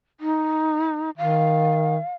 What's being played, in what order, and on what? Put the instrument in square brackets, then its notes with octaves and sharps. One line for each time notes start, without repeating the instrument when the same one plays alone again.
[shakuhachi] D#4
[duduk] D#3 [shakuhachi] F5